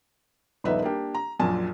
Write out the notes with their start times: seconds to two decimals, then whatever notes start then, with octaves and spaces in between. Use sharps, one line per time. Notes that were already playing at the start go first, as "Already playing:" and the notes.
0.64 D#1 A#1 B3 D#4 B4 E5
0.82 A#3 D4 G4
1.15 A#5
1.40 A#1 F#2 A#2 G#5 A5